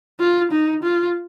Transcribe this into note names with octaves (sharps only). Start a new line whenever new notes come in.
F4
D#4
F4